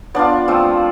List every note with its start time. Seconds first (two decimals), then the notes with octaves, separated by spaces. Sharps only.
0.14 B3 D4 F4 D5
0.48 F3 A3 C4 F4